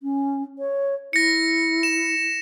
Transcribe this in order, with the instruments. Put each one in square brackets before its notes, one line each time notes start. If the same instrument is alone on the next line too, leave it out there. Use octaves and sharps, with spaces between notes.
[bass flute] C#4
C#5
[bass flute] E4 [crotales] A#6 C#7
[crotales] E7